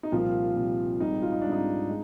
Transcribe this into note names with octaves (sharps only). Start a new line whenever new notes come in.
D#4
C2 A#2 F3 G3 F4
C2 A#2 G3
G#1 G#2 G3 D#4
F4
D#4
G#1 G#2 G3 D4
D#4
G#3